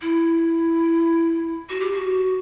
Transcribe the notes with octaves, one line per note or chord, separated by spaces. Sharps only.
E4
F#4
G4
F#4